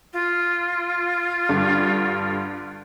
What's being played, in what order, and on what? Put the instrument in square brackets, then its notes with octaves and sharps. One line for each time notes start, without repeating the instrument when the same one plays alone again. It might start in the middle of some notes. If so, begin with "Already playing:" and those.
[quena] F4
[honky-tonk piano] G2 D3